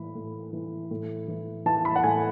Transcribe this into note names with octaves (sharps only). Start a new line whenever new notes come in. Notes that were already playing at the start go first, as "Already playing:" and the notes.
Already playing: A2 E3 B5
A2
E3
A2
E3
E3 A5
B5
F#5
A2 G#5